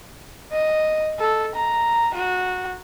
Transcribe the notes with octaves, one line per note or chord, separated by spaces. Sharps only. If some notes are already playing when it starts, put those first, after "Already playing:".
D#5
A4
A#5
F#4